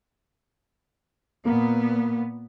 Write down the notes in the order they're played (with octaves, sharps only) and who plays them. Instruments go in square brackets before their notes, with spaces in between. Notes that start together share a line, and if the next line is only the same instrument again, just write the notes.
[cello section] A#2 B3 [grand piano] A#3